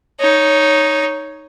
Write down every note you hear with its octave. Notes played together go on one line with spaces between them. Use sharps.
D#4 C#5